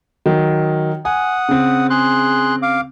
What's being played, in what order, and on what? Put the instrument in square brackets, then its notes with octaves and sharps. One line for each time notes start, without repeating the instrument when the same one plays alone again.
[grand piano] D#3 F#3
[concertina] F#5 D#6 [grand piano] G#5
[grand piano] C#3 C4
[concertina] G#4 C6 F#6
F5 D6